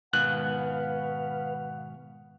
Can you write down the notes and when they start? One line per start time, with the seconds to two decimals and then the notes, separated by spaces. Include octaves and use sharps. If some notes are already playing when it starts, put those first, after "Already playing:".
0.13 G#2 B2 D#3 B4 F5 F#5 F#6